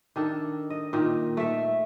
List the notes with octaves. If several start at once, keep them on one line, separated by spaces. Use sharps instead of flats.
D#3 D4 A4
D#5
A#2 D#3
A3 E5